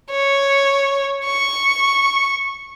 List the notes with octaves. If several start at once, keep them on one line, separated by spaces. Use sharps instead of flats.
C#5
C#6